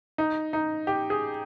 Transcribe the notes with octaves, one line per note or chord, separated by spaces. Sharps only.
D#4
D#4
G4
G#4